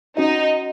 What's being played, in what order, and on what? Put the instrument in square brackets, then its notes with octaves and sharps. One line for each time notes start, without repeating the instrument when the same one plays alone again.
[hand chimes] C#4 F#4 D#5 [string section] D#4